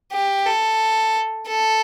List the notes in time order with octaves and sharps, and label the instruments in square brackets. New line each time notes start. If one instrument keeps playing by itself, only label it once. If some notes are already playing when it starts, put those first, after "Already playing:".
[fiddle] G4
A4
A4